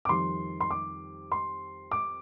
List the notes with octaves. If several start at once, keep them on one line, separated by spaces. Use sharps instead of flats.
D6
F2 D#3 G3 C6
C6
D6
C6
D6